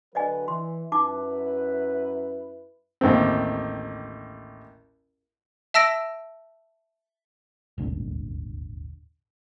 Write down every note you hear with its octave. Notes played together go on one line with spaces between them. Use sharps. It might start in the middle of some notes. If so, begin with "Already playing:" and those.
D3 F#3 B4 D5 D#5 G#5
E3 C6
F#2 D#4 E4 B4 A5 D6
A1 D#2 C4
E5 A5 E6 A#6 D7
D#1 G#1 D2